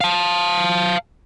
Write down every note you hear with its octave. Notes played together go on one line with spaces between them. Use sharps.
F5 A5